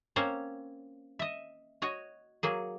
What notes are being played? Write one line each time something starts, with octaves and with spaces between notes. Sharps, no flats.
A#3 C4 C#4 C5 C#5
D#5 E5
F#4 C#5 D#5
F#3 A#3 G#4